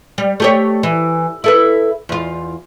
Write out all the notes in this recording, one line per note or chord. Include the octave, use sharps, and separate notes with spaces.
G3
A3 G4 C#5
E3
E4 A4 B4
E2 F4